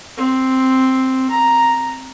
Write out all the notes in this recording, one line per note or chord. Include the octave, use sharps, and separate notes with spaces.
C4
A#5